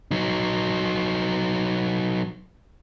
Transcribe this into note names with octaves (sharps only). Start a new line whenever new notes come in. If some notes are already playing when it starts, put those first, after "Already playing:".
F#3 D#4